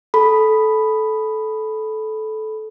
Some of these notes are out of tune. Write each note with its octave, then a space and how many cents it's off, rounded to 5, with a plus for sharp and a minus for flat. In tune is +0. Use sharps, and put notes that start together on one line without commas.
A4 -15 B5 +0